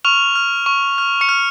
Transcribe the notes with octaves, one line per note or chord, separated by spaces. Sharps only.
C#6 F6 F7
F6
C#6
F6
C#6 C#7
F6